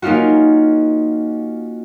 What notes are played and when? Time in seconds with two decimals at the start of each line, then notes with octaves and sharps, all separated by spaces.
0.02 A#3 C#4 D#4 F4 F#4